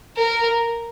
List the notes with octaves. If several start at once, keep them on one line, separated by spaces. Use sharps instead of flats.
A#4